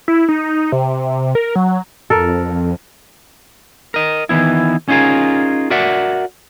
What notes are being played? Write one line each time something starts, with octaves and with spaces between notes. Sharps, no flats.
E4
D#4
C3
A#4
F#3
F2 A4 A#4
A#4 D#5
D#3 E3 B3 E4
C#4 D#4 F4 G#4 A#4
F#4 A#4 D5 E5 F#5